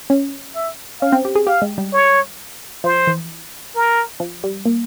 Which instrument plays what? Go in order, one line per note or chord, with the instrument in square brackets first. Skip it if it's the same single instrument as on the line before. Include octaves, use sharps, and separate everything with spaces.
[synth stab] C#4
[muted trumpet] E5
[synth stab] C#4 [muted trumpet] F5
[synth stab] C4
G4
G#4
[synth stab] G4 [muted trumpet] F5
[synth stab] G#3
G3
[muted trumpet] C#5
[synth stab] F3 [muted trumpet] C5
[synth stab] E3
[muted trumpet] A#4
[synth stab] F3
G3
A#3